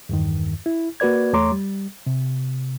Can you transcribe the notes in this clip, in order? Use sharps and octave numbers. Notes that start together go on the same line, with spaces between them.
E2 G2 D#3
E4
A#3 F#4 B4 D5 G#6
E2 A3 C#5 A#5 C6 D6
G3
C3